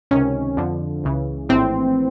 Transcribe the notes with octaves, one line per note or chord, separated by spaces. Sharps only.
C#2 C3 D#3 C#4
F2 D3 F3
C#2 C#3 E3
A#1 A2 E3 C4